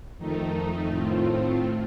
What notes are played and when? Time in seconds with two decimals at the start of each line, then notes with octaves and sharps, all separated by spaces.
0.18 F2 D#3 A3 D#4
0.88 A2 A3 C4 F4